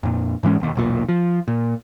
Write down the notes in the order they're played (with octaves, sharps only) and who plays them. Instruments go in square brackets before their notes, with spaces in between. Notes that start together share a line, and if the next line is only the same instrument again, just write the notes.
[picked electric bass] F2 A#2
G#2 E3 G#3 C#4
E1 D#2
E1 B1 A#2
F3
A#2